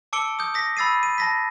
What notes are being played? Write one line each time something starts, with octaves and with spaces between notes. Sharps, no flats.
A5 D6 E6 C#7 D7 G7
D#6 G6
D#6 A#6 B6
B5 E6 A6 C7 D#7
D#7
A5 A#6 B6